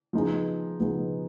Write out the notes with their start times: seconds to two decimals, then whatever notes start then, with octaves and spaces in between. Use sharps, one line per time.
0.13 F3 B3 D#4 G#4
0.80 F3 B3 D#4 G#4